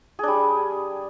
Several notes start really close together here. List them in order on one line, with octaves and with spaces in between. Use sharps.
G#4 D4 G3